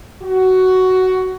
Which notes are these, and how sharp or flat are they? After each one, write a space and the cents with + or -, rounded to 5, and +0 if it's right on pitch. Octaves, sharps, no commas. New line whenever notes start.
F#4 +10